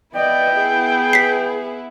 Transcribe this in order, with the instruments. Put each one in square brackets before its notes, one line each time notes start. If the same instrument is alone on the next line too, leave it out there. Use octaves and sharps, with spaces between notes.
[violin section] B3 E4 [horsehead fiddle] D5 D#5 [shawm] G5
[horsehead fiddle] G#4
[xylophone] B6 C7